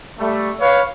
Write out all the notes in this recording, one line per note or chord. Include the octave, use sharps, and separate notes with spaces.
G3 A3
B4 C#5 F5